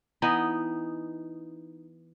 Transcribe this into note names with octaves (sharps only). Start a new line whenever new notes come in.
E3 B3 D#4 D#5